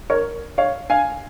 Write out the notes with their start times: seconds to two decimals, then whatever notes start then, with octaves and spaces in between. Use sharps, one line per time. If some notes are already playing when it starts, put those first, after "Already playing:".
0.10 A#4 C#5
0.58 C#5 F5
0.90 F5 G#5